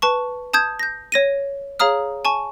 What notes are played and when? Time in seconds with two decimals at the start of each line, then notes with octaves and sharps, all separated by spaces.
0.02 B4 A5 C#6
0.54 A5 D#6 G6 G#6
0.79 G6 A#6
1.12 C#5 A#6 D#7
1.80 G#4 C#5 F5 A#5 D#6 F6
2.25 G#5 A5 C#6